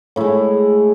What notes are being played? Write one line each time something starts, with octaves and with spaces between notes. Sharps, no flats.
A2 G#3 E4